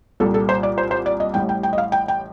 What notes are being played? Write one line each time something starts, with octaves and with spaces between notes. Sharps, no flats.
C2 A#2 G3 A4
A4
C5
D5
C5
C5
D5
D#5
A1 A2 G3 G5
G5
G5
D#5
F5
G5
G5